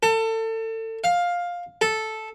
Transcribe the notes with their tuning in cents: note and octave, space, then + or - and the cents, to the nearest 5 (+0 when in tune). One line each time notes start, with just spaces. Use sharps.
A4 +30
F5 +10
A4 -5